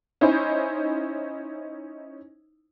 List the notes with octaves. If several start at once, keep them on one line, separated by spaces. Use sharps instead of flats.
C#4 D#4 E4 C5